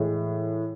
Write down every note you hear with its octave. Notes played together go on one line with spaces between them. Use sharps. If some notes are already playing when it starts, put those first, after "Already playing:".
Already playing: A2 E3 G#3